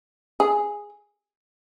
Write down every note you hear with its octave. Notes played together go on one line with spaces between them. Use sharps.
G#4